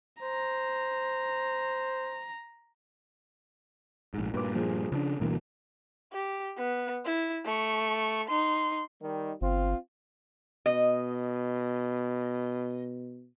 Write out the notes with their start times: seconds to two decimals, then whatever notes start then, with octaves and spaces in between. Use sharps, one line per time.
0.22 C5 A#5
4.14 A#1 G#2
4.34 G2 A#2 F4 B4 D6
4.55 F3 G#4
4.92 C#3 B3 D4
5.20 D2 G2 B2 E3 A#3
6.13 G4
6.58 B3
7.06 E4
7.45 A3 C#6
8.28 D#4 C6
9.02 D#3 G3
9.41 G1 C4 F4
10.66 B2 D#5